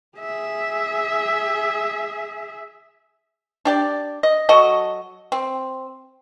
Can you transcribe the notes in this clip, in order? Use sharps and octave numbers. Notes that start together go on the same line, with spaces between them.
G#4 E5
D4 G4 D5
D#5
F#3 F#4 A4 D#5
C4